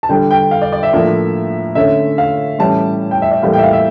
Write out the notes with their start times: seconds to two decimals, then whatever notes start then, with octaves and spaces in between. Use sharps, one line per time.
0.03 A5
0.09 D3 G3 D4 G5
0.31 G5
0.51 F5
0.62 D5
0.72 D5
0.83 E5
0.92 A2 F3 A#3 D4
1.75 D3 A3 C#4 E5
2.18 F5
2.59 A2 E3 G3 C#4 A5
3.11 G5
3.22 E5
3.31 D5
3.42 A2 E3 G3 A#3 F5
3.53 G5
3.58 E5
3.63 F5
3.73 E5